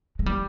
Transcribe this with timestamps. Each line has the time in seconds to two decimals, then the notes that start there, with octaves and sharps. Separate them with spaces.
0.19 G#3
0.26 G3